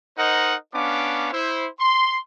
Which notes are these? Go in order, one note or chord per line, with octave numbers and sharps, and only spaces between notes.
D#4 A#4 C5 D#5 F#5
B3 C#4 D4 F5 D6
E4 C5
C6